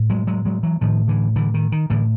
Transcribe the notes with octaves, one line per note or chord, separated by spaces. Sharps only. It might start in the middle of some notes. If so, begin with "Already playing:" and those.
Already playing: A2
F#3 G#3
F#3 G#3
F#3 G#3
E3 F#3
A2 D#3 F3
D3 E3
D3 E3
D#3
D#3
A2 D3 E3